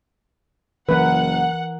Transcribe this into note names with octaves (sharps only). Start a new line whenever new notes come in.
F#1 E3 A#4 B4 F#5